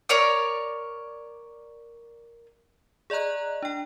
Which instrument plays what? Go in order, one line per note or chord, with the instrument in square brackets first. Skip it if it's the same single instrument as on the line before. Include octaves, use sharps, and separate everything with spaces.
[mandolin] A#4 C#5 D5
[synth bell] G#4 D5 D#5 A#5 F#6
D4 G5